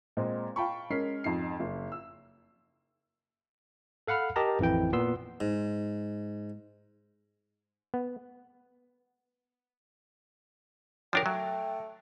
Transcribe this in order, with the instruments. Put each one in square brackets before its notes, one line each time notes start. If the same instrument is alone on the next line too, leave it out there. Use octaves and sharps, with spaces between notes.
[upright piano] A#2 G#3 C4
F5 G5 A5 B5 C#6
G#3 C#4 A#4 B6 C7
F2 G#2 C7
F#1
E6
[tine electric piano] A4 F5 F#5 B5 F6
G4 A#4 D#5 A5 A#5
A1 F2 E3 E4 G5
A#2 B3 C6 E6
[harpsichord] G#2
[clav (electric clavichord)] B3
[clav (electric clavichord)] F3 D4 A#4 [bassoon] F#3 [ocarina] G5
[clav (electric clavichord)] F#3 [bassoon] A3